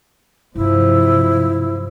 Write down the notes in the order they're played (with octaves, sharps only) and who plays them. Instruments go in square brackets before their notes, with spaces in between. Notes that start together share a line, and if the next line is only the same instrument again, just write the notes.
[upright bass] G2 F#3 [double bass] C3 F3 [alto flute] E4